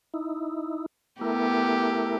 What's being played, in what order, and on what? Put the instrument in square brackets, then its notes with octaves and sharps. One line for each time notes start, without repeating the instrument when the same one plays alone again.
[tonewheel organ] D#4 E4
[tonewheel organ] A3 E4 A#4 [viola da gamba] B3 G4